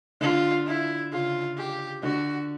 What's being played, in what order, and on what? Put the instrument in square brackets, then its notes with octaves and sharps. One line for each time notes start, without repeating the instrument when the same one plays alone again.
[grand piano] D3 [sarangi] F4
[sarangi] E4
[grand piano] C#3 [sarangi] F4
[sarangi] G4
[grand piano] D3 [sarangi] F#4